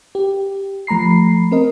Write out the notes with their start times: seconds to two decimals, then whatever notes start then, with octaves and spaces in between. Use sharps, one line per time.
0.15 G4
0.87 F3 A3 A#5 B5 C7
1.51 C4 A#4 D#5